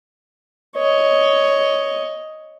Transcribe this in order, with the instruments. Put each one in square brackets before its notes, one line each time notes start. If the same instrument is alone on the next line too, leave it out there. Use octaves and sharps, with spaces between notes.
[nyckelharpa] C#5 D#5